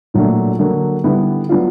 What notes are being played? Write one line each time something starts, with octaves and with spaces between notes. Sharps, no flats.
A#2 F#3 A3 D4
D3 F#3 A#3
D3 G3 B3 E4
F#3 B3 D4 F4